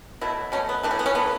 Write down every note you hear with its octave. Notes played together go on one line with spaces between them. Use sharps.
B2 F#3 A3 E4
B2 F#3 A3 C#4
B3
E3 A3 D4
C#4
B3
C#4
E3 A3 B3